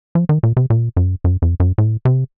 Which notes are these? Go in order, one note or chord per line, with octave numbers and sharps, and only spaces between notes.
F3
D#3
A#2
C3
A#2
F#2
F#2
F2
F#2
A2
C3